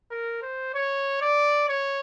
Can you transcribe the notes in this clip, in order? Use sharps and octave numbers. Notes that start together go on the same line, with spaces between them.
A#4
C5
C#5
D5
C#5